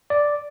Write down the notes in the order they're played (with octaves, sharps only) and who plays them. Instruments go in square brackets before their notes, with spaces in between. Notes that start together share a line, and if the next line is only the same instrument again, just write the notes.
[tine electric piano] D5